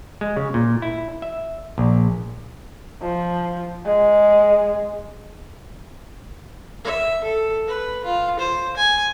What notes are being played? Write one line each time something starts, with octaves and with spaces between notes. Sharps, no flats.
G#3
C#3
A#2
E4
E5
A#1
F3
G#3
E5
A4
B4
F4
C5
G#5